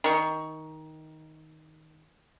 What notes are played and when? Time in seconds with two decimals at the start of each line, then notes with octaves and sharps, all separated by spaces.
0.04 D#3 C#6